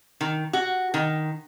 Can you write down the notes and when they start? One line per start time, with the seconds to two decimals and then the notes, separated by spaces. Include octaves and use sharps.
0.21 D#3
0.53 F#4
0.94 D#3